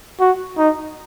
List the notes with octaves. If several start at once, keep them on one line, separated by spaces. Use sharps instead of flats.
F#4
D#4